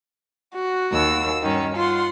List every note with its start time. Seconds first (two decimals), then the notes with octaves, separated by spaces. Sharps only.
0.55 F#4
0.91 D#2 E6
1.43 G2 D#3 C#4
1.76 F4 F#5 C6